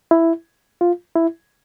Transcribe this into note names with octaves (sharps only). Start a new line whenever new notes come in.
E4
F4
E4